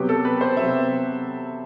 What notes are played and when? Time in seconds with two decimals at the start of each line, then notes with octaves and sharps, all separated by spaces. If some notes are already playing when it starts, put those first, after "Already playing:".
Already playing: C3 F#3 B3 G4
0.09 A4
0.25 B4
0.41 C5
0.57 C3 F#3 B3 E5